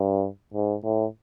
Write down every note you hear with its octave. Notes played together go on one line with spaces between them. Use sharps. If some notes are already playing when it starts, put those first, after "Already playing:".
Already playing: G2
G#2
A2